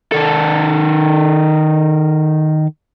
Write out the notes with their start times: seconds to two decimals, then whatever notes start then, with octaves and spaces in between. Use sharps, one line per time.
0.12 D#3 A4